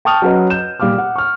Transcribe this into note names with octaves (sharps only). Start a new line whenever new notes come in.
G5 A5 C#6 D#6 F6 F7
F#3 C#4 F#4 B4 D#5
G6 E7
A#2 G3 F5 D6 F6
F#5
C#6 F6